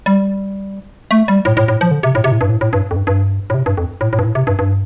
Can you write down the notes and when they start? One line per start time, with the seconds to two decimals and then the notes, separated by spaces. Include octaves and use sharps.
0.06 G3
1.11 A3
1.28 G3
1.45 A2
1.57 A2
1.68 A2
1.81 F3
1.91 D3
2.03 C3
2.15 A2
2.24 C3
2.32 A2
2.41 G2
2.49 A2
2.61 A2
2.73 G2
2.91 F2
2.96 G2
3.07 G2
3.50 A2
3.54 C3
3.66 G2
3.77 F2
4.01 A2
4.13 A2
4.19 G2
4.24 A2
4.35 C3
4.47 G2
4.59 G2